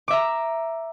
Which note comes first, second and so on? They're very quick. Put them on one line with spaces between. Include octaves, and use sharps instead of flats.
D6 E5 A#5